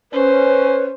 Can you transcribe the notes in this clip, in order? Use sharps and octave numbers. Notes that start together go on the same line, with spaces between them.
C#4 B4 C5